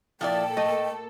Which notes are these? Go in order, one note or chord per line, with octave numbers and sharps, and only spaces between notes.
A#2 F3 A#3 E4 A4 D5 G5
A3 D#5